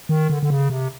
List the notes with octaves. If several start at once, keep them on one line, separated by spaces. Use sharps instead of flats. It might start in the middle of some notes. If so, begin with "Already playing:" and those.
D#3
D3
D3
C#3
C3